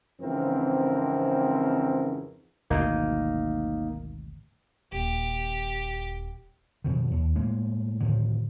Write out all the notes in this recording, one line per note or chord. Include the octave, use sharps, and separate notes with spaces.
F2 G#2 C#3 E3 C4 A#4
G#1 D2 B2 A#3 D#4
D#1 G4
F2 B2 D#3
D#2
A2 G#3 A#3
A2 D3 D#3 F3